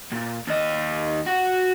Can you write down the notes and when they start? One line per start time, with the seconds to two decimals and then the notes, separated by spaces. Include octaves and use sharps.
0.12 A#2
0.47 D#2 D#5
1.26 F#4